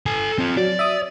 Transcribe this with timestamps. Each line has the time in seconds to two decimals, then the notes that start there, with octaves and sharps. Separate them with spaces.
0.06 A4 G#5
0.38 C4 F4
0.57 F#3 D5
0.79 E5 D#6